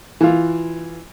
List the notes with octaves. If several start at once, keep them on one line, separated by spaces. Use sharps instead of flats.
E3 F4